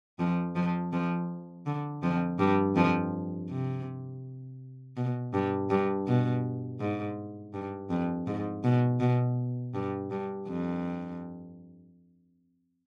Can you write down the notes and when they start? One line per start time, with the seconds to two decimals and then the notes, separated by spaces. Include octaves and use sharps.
0.19 F2 F3
0.55 F2 F3
0.93 F2 F3
1.66 D3
2.03 F2 F3
2.39 G2 G3
2.76 F2 F3
3.50 C3
4.97 B2
5.34 G2
5.70 G2
6.07 B2
6.80 G#2
7.54 G2
7.90 F2
8.27 G#2
8.64 B2
9.00 B2
9.74 G2
10.11 G2
10.47 F2